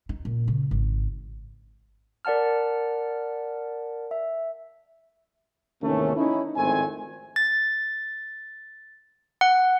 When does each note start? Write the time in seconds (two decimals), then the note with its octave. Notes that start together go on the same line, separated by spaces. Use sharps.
0.09 D#4
0.25 A#2
0.48 C#3
0.71 G#1
2.25 A#4 D5 F#5 A5 F6
4.11 E5
5.82 D#2 G#2 C3 E3 A3 C#4
6.16 C#4 D#4 E4
6.56 G#1 F2 A2 A3 C4 G#5
7.36 A6
9.41 F#5